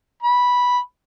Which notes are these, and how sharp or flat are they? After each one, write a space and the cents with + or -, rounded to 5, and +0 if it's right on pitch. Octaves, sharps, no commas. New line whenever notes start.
B5 -10